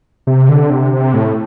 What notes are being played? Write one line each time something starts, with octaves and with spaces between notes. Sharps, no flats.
C3
D3
C3
C3
A2